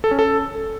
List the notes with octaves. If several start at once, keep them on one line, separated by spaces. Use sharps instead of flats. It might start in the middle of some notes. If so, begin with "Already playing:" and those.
A4
C#4
A4